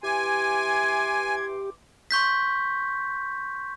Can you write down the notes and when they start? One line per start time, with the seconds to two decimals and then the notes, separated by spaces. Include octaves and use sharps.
0.03 E3 G4 G#5 C6 D6 G#6
2.11 C6 C#6 G6 B6